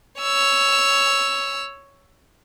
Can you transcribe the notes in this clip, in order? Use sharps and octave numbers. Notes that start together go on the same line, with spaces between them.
C#5 E6